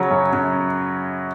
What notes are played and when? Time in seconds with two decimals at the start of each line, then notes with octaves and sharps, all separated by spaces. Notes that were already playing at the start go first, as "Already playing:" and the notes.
Already playing: C#3 F#3 C#5
0.11 F#2
0.33 F#2